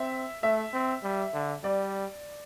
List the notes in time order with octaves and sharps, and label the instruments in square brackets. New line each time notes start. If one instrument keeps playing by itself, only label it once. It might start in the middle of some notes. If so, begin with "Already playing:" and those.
Already playing: [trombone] C4 [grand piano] E5
[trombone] A3 [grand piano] E5
[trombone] C4
G3
D3
[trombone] G3 [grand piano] D5